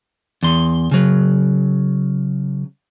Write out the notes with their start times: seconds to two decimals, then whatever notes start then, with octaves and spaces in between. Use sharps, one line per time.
0.43 E2 C6
0.91 C#3 F#3